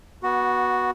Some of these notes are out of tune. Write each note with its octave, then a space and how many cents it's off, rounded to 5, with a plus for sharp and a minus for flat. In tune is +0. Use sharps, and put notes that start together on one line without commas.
B3 -20 F#4 +0